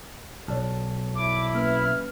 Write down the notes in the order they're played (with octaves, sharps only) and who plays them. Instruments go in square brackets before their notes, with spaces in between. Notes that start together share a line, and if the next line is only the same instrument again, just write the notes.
[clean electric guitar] B1 [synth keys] C#5 D5 A5
[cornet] E4 [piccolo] D6
[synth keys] A#3 C#4 B4 [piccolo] F6